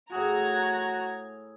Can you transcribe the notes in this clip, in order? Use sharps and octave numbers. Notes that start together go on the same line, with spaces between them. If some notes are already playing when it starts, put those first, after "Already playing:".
A2 F#4 G#4 A#5 G#6